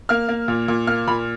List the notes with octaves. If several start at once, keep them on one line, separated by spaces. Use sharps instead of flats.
A#3 F6
A#3
A#2
A#2
A#3 F6
A#2 B5